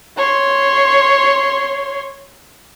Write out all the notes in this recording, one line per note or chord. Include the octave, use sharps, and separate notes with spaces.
C#5 C6